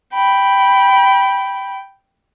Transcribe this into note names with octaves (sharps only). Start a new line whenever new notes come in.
G5 B5